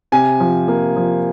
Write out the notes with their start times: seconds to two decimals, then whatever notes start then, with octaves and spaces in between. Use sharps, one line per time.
0.12 C3 G#5
0.40 F3
0.68 A#3
0.96 F3